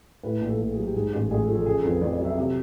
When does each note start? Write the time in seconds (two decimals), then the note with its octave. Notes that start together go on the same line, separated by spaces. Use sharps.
0.23 A2 B4
0.41 A#1
0.47 A4
0.58 A#1 A4
0.71 G#4
0.76 F#3
0.83 G4
0.94 G#2 G#4
1.13 A1
1.31 A1 G#4
1.42 A4
1.48 F3
1.55 A4
1.65 C#3 G#4
1.77 A4
1.84 F2
1.89 B4
2.02 F2 D5
2.13 D#5
2.20 F#3
2.25 E5
2.38 C3